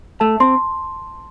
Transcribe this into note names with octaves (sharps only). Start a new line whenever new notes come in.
A3 A5
C4 C6